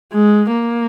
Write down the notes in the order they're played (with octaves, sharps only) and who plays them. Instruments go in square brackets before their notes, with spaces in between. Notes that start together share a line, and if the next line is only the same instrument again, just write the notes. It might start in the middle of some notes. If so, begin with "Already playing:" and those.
[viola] G#3
A#3